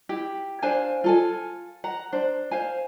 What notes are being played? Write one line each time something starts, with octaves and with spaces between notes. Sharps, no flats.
E4 G4
D4 C5 F5 G#5
F4 A4 G#5
F#5 A#5
D4 C5
C5 F5 G#5